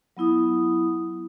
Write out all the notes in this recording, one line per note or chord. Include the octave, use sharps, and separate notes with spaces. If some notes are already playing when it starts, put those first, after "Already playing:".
F#3 B3 E4 D#6